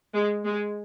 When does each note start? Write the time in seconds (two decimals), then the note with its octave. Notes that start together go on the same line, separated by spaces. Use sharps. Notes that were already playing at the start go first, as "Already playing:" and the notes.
0.14 G#3
0.45 G#3